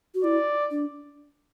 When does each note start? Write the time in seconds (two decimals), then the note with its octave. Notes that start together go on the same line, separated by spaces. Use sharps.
0.14 F#4
0.24 E4 D5
0.71 D4